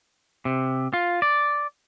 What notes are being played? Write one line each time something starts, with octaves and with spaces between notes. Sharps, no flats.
C3
F4
D5